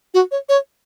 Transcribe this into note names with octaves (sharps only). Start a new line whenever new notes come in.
F#4
C#5
C#5